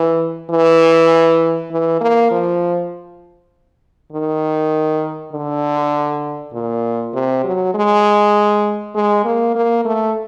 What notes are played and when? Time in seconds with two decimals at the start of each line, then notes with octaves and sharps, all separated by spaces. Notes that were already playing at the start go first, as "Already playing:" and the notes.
Already playing: E3
0.50 E3
1.71 E3
2.01 A#3
2.31 F3
4.12 D#3
5.33 D3
6.54 A#2
7.14 C3
7.44 F#3
7.75 G#3
8.95 G#3
9.25 A#3
9.55 A#3
9.85 A3